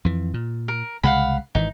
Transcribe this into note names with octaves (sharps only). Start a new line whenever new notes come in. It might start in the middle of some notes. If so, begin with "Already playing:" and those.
F2 E3
A#2
A#4
C2 C#3 G#3 F5 F#5 B5
G#1 D#3 E3 D#4